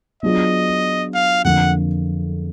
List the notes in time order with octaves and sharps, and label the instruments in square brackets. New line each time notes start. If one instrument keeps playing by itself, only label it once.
[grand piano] F#3 B3 D4 F4 G#4 [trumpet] D#5
[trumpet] F5
[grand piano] F2 D3 F3 A#3 [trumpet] F#5